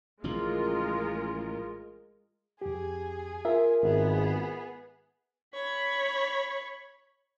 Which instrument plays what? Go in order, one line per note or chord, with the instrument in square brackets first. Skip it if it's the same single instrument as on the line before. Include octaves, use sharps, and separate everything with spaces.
[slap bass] A1 C#3 F3 [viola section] G#3 F4 A#4
[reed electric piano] F2 G4 [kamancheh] G#4 G#5
[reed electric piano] F4 [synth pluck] A#4 E5
[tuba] G#1 [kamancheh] B3 G#4
[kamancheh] C#5 B5